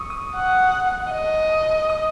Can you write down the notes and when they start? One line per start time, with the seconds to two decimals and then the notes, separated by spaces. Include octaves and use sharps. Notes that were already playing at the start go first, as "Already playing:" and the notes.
Already playing: C#6 D#6 E6
0.10 D#6
0.36 F#5
1.12 D#5
1.90 D#6